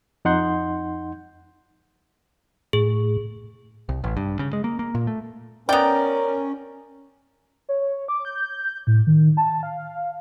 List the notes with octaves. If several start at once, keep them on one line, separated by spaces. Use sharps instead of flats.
F2 D#4 F#5 C6 G6
A2 G#4
C2
A1
G2
C#3
G#3
A#3
A#3
A#2
A3
B3 C#4 A#4 D5 G5 A#5
C#5
D6
G6
A2
D#3
A5
F5